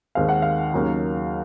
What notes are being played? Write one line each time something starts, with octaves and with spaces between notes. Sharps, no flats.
D#2 D#3 G#3 C4 F5
F#5
F5
D#2 C#3 F#3 A#3